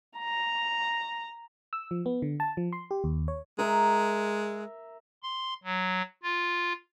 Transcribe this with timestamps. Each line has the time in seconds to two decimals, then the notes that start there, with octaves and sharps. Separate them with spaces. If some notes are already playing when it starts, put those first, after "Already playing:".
0.18 A#5
1.73 E6
1.91 F3
2.06 B3
2.22 D3
2.40 A5
2.57 F3
2.73 C6
2.91 G4
3.04 D#2
3.28 C#5
3.59 G#3 A#4 E5
5.23 C6
5.64 F#3
6.23 F4